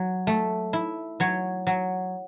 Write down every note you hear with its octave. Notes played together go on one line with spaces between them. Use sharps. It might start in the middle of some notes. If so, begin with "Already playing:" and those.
Already playing: F#3
A3
E4
F#3 C#5
F#3